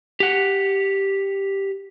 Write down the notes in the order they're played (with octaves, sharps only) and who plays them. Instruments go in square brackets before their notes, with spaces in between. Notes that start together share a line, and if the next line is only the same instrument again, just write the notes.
[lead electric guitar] G4 F#5